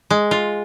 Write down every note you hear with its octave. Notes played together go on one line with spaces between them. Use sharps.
G#3
F4